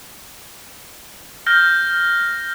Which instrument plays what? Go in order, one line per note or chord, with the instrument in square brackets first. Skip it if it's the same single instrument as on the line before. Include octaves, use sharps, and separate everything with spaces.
[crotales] F6 G6 A#6